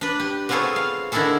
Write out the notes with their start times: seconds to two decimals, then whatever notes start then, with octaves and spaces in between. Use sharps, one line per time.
0.01 D4 B4
0.20 G4
0.49 B3 C4 F4 G#4 A4 C#5
0.76 F5
1.12 D3 D#3 D4 E4 G#4 A4